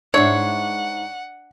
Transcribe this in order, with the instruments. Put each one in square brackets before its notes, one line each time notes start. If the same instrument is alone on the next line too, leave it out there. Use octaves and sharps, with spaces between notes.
[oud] G#2 E4 [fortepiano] D4 [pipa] C#5 [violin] F#5